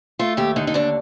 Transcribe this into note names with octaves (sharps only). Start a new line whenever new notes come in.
A3 F4
D#2 G4
D3 D#4
D#4
D#2 D4